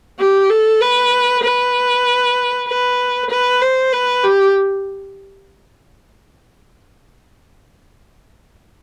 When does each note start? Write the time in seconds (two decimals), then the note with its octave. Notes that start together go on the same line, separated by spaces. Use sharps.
0.19 G4
0.50 A4
0.81 B4
1.43 B4
2.68 B4
3.30 B4
3.62 C5
3.93 B4
4.24 G4